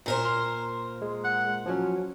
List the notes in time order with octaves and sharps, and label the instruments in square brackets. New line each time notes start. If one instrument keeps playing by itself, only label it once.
[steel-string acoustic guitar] A#2 A#4 C5
[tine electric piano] C6 F6
G#3
[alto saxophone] F#5
[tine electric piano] F3 C#4 [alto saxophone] F#3